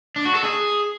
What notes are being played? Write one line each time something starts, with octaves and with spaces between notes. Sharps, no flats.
D4
F#4
A4
G#4